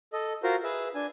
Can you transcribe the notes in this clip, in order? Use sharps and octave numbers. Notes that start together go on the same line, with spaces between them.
A4 D#5
F4 F#4 A#4 C5
G#4 B4 E5
D4 G#5